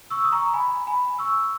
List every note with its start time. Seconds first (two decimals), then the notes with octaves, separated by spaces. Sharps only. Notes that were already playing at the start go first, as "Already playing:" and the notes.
0.10 C#6 E6
0.25 D#6
0.32 A#5 C#6
0.53 G#5 B5
0.87 G#5 B5
1.19 C#6 E6